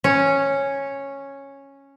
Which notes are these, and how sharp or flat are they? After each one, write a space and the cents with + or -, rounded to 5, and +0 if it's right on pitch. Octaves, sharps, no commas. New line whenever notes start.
C#4 -5